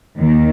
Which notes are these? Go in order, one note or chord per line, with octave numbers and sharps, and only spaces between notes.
D#2 D#3